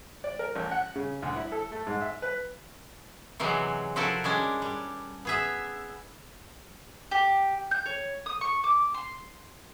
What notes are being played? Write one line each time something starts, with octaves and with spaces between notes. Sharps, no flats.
D5
A#4
A1
F#5
C#3
D2
E4
A4
A3
G#2
E5
B4
C3 E3 F#3 G#3 C4
F3 C4 E4 F#4 A4 A#4
G3 G#3 C#4 D4
G3
B3 G#4 E5
G4
G6
C#5
D#6
C#6
D6
C6